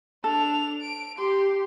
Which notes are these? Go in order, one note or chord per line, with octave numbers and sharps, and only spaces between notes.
D4 A4 F7
D7
G4 C6